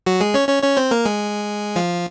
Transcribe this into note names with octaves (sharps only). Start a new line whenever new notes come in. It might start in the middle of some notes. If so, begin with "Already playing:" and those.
F#3 F#4
G#3 G#4
C#4 C#5
C#4 C#5
C#4 C#5
C4 C5
A#3 A#4
G#3 G#4
F3 F4